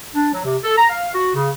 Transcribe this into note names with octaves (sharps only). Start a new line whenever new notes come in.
D4
F#3
C3
A4
A#5
F5
F#4
C#3